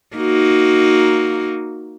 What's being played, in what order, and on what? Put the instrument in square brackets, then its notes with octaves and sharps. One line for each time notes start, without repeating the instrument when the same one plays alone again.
[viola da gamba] A#3 D#4 F#4